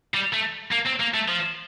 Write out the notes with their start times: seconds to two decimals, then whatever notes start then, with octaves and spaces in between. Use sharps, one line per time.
0.14 G3
0.33 A3
0.71 A#3
0.86 C4
1.00 A#3
1.14 A3
1.28 F3